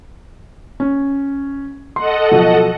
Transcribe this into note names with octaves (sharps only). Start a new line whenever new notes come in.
C#4
A4 D#5 F#5 C6
B2 F3 F#3